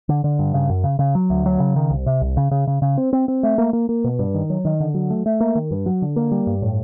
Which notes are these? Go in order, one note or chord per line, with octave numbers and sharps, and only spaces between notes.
D3
D3
G2
C#3
F#2
C#3
C#3
F#3
D2
F#3
C#3
D#3
C2
C3
C2
C#3
C#3
C#3
C#3
C4
C4
C4
A3
A#3
A#3
A#3
B2
G2
D#3
F#3
D#3
D3
F#3
A3
A3
A#3
D#3
G2
F#3
D3
A#3
G3
G2
A2